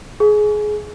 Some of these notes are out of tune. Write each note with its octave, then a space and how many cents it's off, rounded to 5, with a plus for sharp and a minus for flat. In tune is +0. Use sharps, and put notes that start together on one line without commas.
G#4 +20